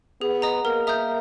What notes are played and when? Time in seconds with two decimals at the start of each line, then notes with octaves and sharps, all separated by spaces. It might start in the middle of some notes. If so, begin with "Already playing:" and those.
0.21 B3 G#4
0.42 D#5 A#5 D#6
0.64 A#3 A#4
0.87 E5 A#5 D#6 G6